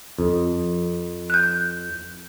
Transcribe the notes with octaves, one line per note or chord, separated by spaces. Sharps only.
F2
F#6 G6